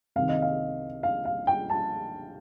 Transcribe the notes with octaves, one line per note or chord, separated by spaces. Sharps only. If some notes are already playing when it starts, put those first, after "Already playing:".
C2 C3 D#3 F5
D#5
F5
F5
F5
G5
A5